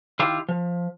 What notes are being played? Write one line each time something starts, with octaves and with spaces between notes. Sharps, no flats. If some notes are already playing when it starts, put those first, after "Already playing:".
D#3 E4 F4 G4
F3